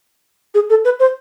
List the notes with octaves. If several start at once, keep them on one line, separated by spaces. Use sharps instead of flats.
G#4
A4
B4
C5